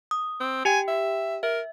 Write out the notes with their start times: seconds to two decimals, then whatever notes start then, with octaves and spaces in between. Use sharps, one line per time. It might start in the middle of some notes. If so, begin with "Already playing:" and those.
0.11 D#6
0.40 C4
0.65 G4 G5 G#5
0.87 E5
1.43 A#4 E5